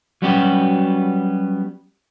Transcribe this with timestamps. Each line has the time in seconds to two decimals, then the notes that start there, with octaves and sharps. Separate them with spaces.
0.22 F#3 G3 B3 C#4 F#4 G4